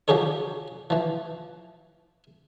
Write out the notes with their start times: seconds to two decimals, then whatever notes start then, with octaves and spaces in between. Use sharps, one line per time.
0.08 F3 F#3 G4 G#4 A#4 C#5
0.90 E3 F3